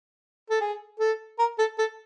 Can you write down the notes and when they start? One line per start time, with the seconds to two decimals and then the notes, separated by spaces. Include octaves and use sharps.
0.50 A4
0.61 G#4
1.00 A4
1.39 A#4
1.59 A4
1.78 A4